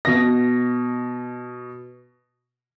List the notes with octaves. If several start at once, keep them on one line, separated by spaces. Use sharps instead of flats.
B2 A#6